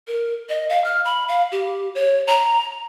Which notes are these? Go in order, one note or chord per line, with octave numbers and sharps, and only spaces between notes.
A#4
D#5
F5
F6
B5
F5
G4
C#5
A#5